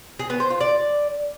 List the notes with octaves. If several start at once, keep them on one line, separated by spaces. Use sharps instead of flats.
G#4
B3
C5
F4
D5